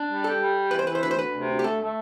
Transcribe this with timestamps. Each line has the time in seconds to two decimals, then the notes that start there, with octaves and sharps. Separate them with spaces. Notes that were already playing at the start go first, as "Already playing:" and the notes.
Already playing: D4
0.09 G3
0.24 G4 A4
0.40 G3
0.55 G4
0.71 E3 B4
0.79 C5
0.86 E3 B4
0.95 C5
1.03 D2 B4
1.11 C5
1.17 D2 B4
1.33 C3
1.49 D2
1.59 G4
1.64 A3 A4
1.80 A3